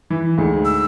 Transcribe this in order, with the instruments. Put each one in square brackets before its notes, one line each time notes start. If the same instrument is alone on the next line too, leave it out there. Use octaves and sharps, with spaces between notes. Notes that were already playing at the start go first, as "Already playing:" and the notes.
[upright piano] E3
D2 G#2
[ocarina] E6